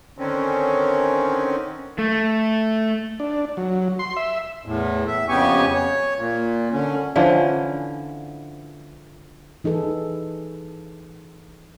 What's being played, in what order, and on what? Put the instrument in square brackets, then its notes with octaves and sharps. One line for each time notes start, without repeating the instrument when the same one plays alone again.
[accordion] D3 D#3 C4 C#4
[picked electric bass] A3
[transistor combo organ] D4
F#3
C6
E5
[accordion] E2 A2
E5
F2 C#3 B3 G4 G#5 C#6
C#5
A#2
D3 C#4
[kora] D3 E3 F3 C#4
[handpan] E3 D#4 G#4 A4 B4